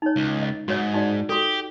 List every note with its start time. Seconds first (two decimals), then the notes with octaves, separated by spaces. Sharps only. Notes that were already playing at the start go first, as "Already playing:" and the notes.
0.02 D#4 C#5
0.16 C#2
0.42 D#5
0.68 G#2 F#4 C#5
0.94 D#4 F#4 D5
1.29 F#4 G4 A4